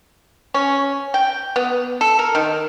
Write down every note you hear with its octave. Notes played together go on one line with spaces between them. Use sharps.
C#4
G5
B3
A4
A#4
D#3